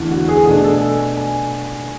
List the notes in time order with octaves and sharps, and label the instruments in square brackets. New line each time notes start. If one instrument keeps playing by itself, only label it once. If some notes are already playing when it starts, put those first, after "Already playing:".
Already playing: [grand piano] E2 D3 A3 E4
F#4
G#4
B2 A3 D4 G#4
A4
G#5
G#5